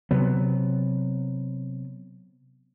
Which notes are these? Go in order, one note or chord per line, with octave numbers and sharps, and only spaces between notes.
C3 F#3 B3